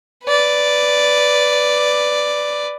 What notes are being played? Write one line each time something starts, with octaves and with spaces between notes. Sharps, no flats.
B4 D5